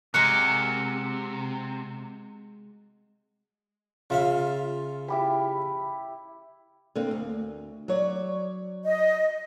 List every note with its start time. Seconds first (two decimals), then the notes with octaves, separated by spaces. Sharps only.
0.14 C3 G#3 F#4 A#4 F#6 C#7
4.10 C#3 F4 E5 F5
5.08 E4 G4 B5
6.95 D3 A#3 C4
7.11 D2
7.88 F#3 C#5 D5
8.85 D#5